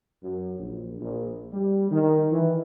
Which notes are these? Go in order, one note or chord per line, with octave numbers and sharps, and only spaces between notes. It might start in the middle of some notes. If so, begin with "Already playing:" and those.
F#2
A#1
A#1
G3
D#3
E3